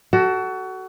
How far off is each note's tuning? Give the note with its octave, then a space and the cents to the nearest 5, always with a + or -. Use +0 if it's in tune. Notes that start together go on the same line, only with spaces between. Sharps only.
F#4 +25 A4 +0